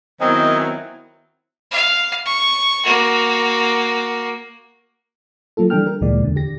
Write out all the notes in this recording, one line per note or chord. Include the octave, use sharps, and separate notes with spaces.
D#3 F#3 B3 C4 E4 A#4 D#5 G#5
F5
C#6
A#3 F#4
F#3 A#3 F4 A4
E3 G3 D4 A4 G5 F6
A#4
D2 A#2 E3 G#3 D5
E2 D3
G4 A#6